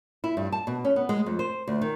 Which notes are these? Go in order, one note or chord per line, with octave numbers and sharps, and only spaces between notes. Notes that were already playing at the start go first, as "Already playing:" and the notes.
E4
G2
A5
B2
C#4
B3
G#3
F2
C5
D2
D#3